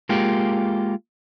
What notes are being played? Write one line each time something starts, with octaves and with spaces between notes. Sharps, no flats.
G#3 A#3 F4 G4